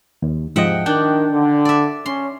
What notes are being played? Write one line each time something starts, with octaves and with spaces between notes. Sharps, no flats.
D#2
G#2 C3 F3 D#5 E5 F#5 G5
D#3 D4 G5 F#6 G6
D3
D5 E5
C#4 C6